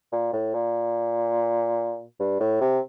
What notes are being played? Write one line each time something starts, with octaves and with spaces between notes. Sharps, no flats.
A#2
A2
A#2
G2
A2
C3